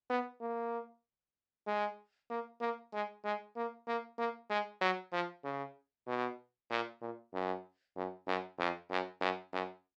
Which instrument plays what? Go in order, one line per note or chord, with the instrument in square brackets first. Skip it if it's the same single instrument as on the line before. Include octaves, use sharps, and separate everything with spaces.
[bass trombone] B3
A#3
G#3
A#3
A#3
G#3
G#3
A#3
A#3
A#3
G#3
F#3
F3
C#3
B2
A#2
A#2
F#2
F#2
F#2
F2
F#2
F#2
F#2